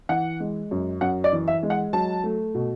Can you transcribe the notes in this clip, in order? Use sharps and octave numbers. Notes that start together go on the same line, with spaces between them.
E3 F#5
G#3
F#2
F#2 F#5
D5
E3
E5
G#3
F#5
F#3 A5
A3
B2